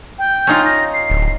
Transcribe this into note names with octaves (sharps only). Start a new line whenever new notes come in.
G5
C#4 D#4 F4
A#6
C7
D1